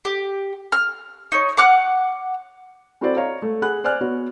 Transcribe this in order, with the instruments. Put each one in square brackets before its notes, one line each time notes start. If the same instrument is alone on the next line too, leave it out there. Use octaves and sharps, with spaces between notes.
[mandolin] G4
F6
D#4 C#5
F#5 D6 F6 F#6
[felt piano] C4 E4 F#4 A4 C5 D5
C#5 D#5 F5 A#5
A3
G#4 F#5 B5 F#6
C5 D5 G#5 F6 F#6
B3 F#4 B4 C#5